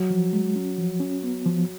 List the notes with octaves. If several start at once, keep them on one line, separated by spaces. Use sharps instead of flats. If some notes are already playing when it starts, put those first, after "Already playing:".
Already playing: F#3
F3
G#3
C#4
F3
C#4
B3
F3